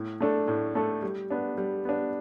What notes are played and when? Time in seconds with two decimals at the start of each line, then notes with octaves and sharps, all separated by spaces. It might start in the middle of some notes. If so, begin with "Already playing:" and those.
Already playing: A2
0.20 A3 D4 A4
0.48 A2
0.75 A3 D4 A4
1.03 G3
1.31 B3 D4
1.58 G3
1.85 B3 D4